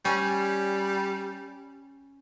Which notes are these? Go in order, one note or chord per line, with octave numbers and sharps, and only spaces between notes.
G3 C#4